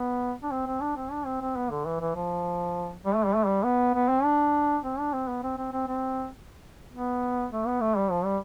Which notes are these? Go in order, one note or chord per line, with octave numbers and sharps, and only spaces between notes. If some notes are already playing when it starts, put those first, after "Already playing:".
Already playing: B3
D4
C4
C4
D4
C4
D4
C4
C4
B3
D3
E3
E3
F3
G3
A3
G3
A3
G3
B3
B3
C4
D4
C4
D4
C4
B3
C4
C4
C4
C4
B3
A3
B3
A3
G3
F3
G3